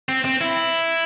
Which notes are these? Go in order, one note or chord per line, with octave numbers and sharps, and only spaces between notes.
C4
C4
E4